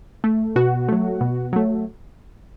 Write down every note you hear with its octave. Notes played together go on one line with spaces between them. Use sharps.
A3
B2 F#4
F#3 A3
B2
F#3 A3